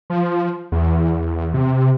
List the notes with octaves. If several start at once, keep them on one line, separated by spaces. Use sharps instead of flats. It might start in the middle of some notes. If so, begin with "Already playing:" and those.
F3
E2
C3